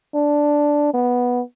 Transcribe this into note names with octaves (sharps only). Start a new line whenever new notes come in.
D4
B3